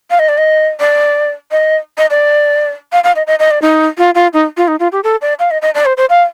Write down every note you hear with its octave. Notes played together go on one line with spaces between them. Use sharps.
F5
D#5
D5
D#5
D5
D#5
D#5
D5
F5
F5
D#5
D#5
D#5
D5
D#4
F4
F4
D#4
F4
D#4
F4
G4
A4
D5
F5
D#5
D#5
D5
C5
C5
F5